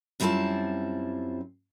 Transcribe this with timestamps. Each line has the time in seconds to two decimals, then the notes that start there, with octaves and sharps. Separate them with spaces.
0.20 F#2 G3 C4 E4 F4 A5